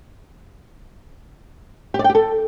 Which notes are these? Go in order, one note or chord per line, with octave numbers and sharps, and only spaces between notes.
G4
D5
G5
G4
A4